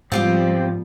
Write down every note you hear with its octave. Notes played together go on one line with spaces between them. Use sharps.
G#2 F3 G3 B3 C4 F4 G4 C5